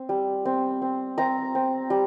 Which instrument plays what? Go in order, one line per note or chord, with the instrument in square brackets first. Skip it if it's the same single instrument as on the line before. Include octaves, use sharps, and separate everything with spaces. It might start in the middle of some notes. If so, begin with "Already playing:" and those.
Already playing: [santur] C4
G3
C4
C4
C4 A#5
C4
G3